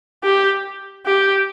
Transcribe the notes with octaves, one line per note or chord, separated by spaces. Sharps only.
G4
G4